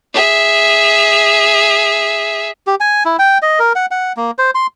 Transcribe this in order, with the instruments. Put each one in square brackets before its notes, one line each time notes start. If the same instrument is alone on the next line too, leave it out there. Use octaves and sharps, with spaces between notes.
[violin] G#4 E5
[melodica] G4
G#5
E4
G5
D#5
A#4
F#5
F#5
A#3
C5
C6